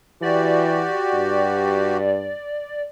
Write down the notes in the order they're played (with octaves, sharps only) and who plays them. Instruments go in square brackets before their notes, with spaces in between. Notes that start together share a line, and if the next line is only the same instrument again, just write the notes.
[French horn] E3 [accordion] F#4 G4 [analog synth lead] D5
[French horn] G2